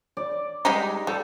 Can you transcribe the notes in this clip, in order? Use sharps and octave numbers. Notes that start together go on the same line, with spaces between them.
D5
G3 G#3 D#4
G3 A4